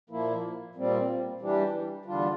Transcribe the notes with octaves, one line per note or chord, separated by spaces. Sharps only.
A#2 F3 A#3 E4
A#2 G3 C4
E3 G3 D4 G4
E2 D3 G3 D4 F4